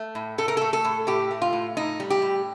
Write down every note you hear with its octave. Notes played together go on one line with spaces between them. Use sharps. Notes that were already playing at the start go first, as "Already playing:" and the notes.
Already playing: A3
A2
A3 A4
A#4
A3 A4
A4
A2
A2 G4
A3
F4
A2
A2 D#4
G3
G4
A2